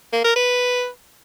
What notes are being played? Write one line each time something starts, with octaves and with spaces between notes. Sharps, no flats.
A#3
A#4
B4